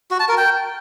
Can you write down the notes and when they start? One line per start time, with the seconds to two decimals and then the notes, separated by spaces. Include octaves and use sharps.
0.11 F#4
0.20 A5
0.29 A#4
0.38 G5